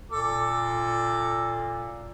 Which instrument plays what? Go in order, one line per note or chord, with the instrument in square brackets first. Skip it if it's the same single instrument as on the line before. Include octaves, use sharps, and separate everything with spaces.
[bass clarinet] A#2 [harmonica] A4 D6